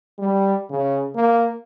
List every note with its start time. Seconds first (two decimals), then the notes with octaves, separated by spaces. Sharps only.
0.18 G3
0.70 C#3
1.15 A#3